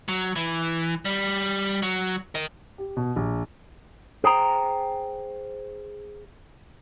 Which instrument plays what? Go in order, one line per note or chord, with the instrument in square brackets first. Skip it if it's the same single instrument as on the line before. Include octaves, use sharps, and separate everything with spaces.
[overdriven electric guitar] F#3
E3
G3
F#3
A#4 D#5
[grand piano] G4
B2
A#1
[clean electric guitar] G#4 C5 G5 A#5